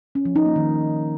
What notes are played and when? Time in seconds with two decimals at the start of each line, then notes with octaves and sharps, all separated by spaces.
0.15 C#4
0.25 F3
0.36 D#4
0.46 A#3
0.56 D#3